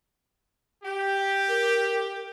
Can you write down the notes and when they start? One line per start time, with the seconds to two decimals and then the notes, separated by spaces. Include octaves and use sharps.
0.83 G4
1.49 A#4